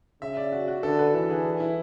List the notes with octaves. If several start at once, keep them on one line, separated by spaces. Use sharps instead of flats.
C#3 E5
D5
F#4
F#4
D3 A4
B4
E3 A4
G#4
E4